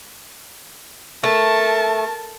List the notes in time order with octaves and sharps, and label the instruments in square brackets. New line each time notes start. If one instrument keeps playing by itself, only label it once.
[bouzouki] A3 [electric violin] A#4 A5